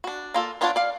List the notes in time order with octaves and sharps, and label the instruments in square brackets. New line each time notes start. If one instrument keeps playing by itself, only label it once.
[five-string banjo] D4 F#4
A#3 F4 A4
B3 D4 F4 C#5 A5
D5 F5